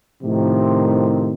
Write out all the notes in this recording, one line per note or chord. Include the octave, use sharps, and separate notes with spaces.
A2 C3 D#3 F3